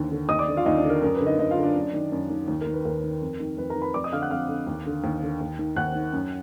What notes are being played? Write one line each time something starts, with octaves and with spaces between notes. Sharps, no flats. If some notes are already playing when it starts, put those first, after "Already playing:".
Already playing: D#2 D3
D3
D#2 D#5 D#6
D5 D6
D3
F4 F5
D#2 D#4 D#5
D4 D5
D3
A#4
F#2 A#4
B4
D3
D#4 D#5
F#2 D#4 D#5
F4 F5
D3
D4 D5
F#2
D#3
F#2
D#3
D#2
A#4
D#3
B4
D#2 A#4
D#3
F2
D#3
F2 B4
A#4 A#5
D#3
B4 B5
F2 D5 D6
D#5 D#6
D3 F5 F6
F#5 F#6
F2 F5 F6
D3
D#2
D3
D#2
D3
D#2
D#3
D#2 F#5 F#6
D#3
F#2